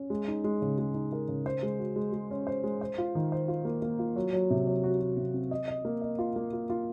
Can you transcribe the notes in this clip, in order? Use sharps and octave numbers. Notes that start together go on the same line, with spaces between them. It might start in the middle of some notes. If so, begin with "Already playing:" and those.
Already playing: C#4
G#3
D#4
G#3
C#3
G#3
D#4
A#4
C#3
C5
G#3
F#4
G#3
G#3
C#4
C5
G#3
C5
F4
D#3
C5
F4
A#3
A#3
F4
F#3
F#3
C3
F#3
F#4
F#4
C3
C4
D#5
D#5
A#3
D#5
F4
A#3
F4
F4